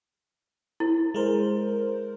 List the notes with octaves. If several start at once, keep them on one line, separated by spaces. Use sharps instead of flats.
E4
G#3 A#4 C5